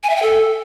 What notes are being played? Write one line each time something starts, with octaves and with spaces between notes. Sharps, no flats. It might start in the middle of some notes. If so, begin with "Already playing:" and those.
G#5
E5
G5
A4